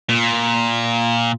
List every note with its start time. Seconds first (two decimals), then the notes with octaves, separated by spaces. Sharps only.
0.09 A#2